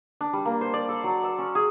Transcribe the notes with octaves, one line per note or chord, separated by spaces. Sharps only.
D4
G3
A#3
C5
D5
A4
F#3
E6
C#4
G#4